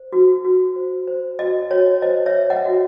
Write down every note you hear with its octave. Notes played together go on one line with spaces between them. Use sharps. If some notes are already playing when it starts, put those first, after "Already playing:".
Already playing: C5
F#4
F#4
C5
C5
F#4 D#5
F#4 C#5
C5 D#5
C#5 E5
C5
D#5 F#5
F#4